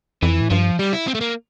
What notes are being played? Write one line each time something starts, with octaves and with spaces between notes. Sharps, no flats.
F2 E3
A2
G2 F3
G3
E4
C4
A3
A#3